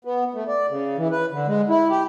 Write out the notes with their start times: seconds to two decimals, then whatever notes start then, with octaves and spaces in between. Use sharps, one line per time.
0.05 B3
0.34 A3
0.48 D5
0.70 C#3
0.97 E3
1.11 B4
1.32 D3
1.48 G#3
1.69 E4
1.90 G4